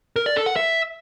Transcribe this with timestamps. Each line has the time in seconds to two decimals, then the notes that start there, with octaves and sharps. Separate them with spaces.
0.16 A#4
0.26 D5
0.36 A4
0.46 F#5
0.56 E5